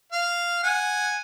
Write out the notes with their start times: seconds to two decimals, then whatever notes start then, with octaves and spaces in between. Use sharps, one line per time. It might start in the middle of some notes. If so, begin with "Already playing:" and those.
0.13 F5
0.63 F#5 G#5